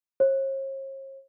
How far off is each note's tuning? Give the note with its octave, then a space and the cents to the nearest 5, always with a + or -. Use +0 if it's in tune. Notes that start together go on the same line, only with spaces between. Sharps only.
C#5 -45